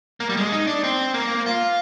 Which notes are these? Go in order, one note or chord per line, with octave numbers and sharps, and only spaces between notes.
A#3
G3
G#3
D#4
D4
C4
A#3
F4